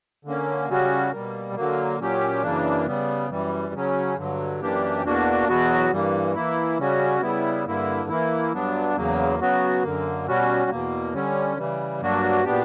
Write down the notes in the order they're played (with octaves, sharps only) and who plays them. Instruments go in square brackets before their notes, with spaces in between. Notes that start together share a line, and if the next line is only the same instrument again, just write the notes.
[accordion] D3 A#3 C#4
C#3 G3 C#4 F#4
B2 G3 A#3
D3 F#3 A#3
A#2 F#3 C#4 G4
F#2 C#3 E3 A#3 D4
C#3 G3 B3
F#2 E3 G3
C#3 F#3 C#4
G2 D3 F#3
F#2 E3 A#3 D4 G4
E2 B2 A#3 D4 F#4
E2 B2 F#3 B3 F#4
G2 E3 G3 A#3
E3 A#3 E4
C#3 G3 C#4 F#4
C#3 G3 B3 E4
G2 D3 A#3 E4
E3 A#3 E4
G2 F#3 B3 D4
E2 C#3 F#3 A#3
C#3 F#3 B3 F#4
F#2 D3 A#3
B2 G3 C#4 F#4
E2 B2 A#3
D3 G3 C#4
C#3 E3 G3
G2 F#3 A#3 D4 F#4
A#2 F#3 B3 D4 G4